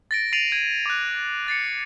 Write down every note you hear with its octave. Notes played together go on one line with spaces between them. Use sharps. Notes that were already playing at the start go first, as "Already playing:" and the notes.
A6 A#6 D7
A6 C7 D7 D#7 F7 F#7
G#6 D#7
D6 F#6
F#6 A6 C7 C#7